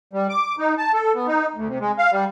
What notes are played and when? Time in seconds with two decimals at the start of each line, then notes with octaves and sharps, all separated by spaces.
0.13 G3
0.29 D6
0.59 D#4
0.78 A5
0.93 A4
1.14 B3
1.27 D#4
1.55 D2
1.68 C3
1.81 G#3
1.98 F5
2.12 G3